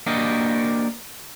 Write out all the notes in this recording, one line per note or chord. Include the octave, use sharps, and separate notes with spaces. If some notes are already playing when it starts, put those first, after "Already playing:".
A#3 D4 F#4 G4 A#4 D#5